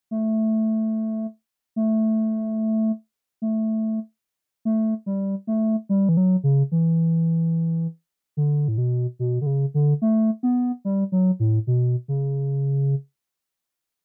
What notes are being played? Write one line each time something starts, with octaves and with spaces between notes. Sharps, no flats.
A3
A3
A3
A3
G3
A3
G3
E3
F#3
C#3
E3
D3
A2
B2
B2
D3
C#3
D3
A3
B3
G3
F#3
A2
B2
C#3